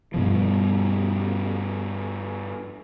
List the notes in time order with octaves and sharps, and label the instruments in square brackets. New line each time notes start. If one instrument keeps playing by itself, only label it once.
[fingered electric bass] G2 B2 F3